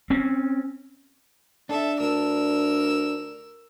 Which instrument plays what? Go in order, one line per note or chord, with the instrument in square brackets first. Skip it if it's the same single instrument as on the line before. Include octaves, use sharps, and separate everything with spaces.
[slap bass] C4 C#4
[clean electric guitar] D4 [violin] A4 E5
[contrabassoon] D2 [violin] A#4 E6